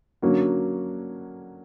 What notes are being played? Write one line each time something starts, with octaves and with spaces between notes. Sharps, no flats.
D3 F#3 A#3 C#4 F#4